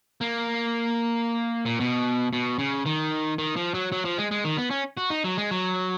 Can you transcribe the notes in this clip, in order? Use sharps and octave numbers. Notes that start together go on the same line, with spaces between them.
A#3
A#2
B2
B2
C#3
D#3
D#3
F3
F#3
F#3
F3
G#3
G#3
D#3
B3
C#4
F#4
D#4
F#3
G#3
F#3